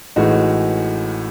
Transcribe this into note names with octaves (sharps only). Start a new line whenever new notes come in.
A1 A2 G#3 D#4 F#4